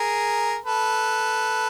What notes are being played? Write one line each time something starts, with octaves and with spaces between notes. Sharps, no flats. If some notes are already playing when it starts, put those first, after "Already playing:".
Already playing: G#4 A#4
A4 B4